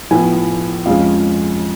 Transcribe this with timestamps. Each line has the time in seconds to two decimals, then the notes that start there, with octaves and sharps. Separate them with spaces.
0.11 A2 F3 B3 G#5
0.86 F2 F3 G#3 C#4 F5